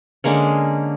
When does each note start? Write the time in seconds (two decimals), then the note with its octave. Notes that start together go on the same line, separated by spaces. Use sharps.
0.24 D3 G#3 A#3 C#4